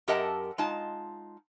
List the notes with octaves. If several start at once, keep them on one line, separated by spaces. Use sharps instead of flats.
F#2 G4 A#4 D#5 F#5 A5
G#3 D#4 F4 A5